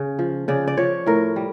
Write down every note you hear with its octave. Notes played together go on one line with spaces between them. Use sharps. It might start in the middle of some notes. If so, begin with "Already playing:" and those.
Already playing: C#3
F3
C#3 D5
D5
F3 C#5
A2 A#4
G3